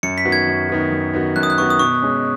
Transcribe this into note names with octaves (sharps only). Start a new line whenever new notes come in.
F#2 C#7
B6
D#3 B3 F#4
G#6
F#2
D#3 B3 F#4
F#2
D#3 B3 F#4
F#2 F#6
D#6
F#6
D#3 B3 F#4 C#6
D#6
B2 C#6
G#3 C#4